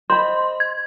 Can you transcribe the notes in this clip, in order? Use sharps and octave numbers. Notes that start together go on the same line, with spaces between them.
C5 D#5 B5 C6
G#6